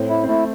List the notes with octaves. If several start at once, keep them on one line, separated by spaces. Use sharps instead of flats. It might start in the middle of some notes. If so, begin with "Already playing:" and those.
Already playing: A2 C4
E4
C4
A3 E4